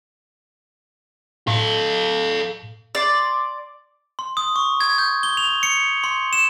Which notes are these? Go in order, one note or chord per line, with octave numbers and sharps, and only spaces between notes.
A2 A4 F5
D5 C6
C6
D#6
C#6
G#6
G6
G7
F7
C#7
C6
E7